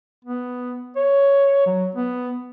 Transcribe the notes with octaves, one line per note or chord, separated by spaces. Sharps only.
B3
C#5
F#3
B3